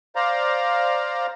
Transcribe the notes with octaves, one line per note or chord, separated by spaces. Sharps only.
C5 D5 F5 A#5